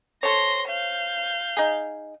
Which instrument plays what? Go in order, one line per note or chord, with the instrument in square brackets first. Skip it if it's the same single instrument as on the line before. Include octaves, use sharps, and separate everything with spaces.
[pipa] A4 C5 C#5 [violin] C6 A#6
[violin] F5 G6
[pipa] D#4 G#4